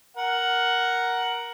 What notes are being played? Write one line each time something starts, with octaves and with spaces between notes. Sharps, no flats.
A#4 F#5